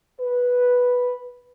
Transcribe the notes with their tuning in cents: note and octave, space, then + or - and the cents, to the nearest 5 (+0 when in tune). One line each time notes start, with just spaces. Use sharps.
B4 -5